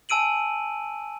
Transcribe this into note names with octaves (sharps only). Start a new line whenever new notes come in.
G#5 A5 E6 D7 D#7 F#7